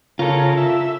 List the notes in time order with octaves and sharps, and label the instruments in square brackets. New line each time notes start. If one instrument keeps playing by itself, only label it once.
[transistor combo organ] C#3 A#4 [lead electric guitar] F4 A4
[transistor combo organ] E5